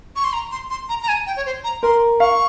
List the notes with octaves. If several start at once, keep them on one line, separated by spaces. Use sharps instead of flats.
C#6
C6
A#5
C6
C6
A#5
A#5
G#5
G5
C#5
C5
A#5
A#4 C6
F5 C#6